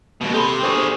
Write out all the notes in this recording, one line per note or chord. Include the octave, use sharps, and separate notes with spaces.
D#2 B2
G4 A4 B5 C6
D4 G4 G#4 A#4 C5